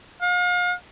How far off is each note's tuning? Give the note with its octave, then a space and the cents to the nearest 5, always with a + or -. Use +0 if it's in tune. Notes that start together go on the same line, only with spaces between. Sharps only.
F5 +40